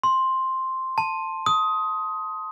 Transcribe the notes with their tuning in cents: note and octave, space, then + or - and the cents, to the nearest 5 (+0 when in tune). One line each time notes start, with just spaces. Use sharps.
C6 +5
A5 +10
D#6 +15